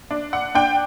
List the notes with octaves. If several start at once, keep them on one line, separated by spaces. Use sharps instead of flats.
D4
F#5
D4 G5